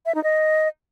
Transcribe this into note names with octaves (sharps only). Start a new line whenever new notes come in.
E5
D#4
D#5